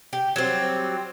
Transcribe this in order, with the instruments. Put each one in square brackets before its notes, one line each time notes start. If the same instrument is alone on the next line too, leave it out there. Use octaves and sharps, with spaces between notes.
[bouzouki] G4
F#3 G3 C4